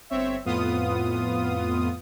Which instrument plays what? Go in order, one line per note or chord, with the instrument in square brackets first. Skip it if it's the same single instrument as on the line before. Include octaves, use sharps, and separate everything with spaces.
[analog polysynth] G1 C4 C#5 E5
F2 A2 B3 F4 D#6